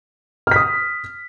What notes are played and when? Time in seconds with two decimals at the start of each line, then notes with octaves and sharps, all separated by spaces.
0.47 F6
0.51 B6
0.56 D#6